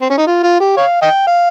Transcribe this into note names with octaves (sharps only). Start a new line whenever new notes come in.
C4
C#4
D#4
F4
F4
G4
C#5 F5
D#5 G5
F5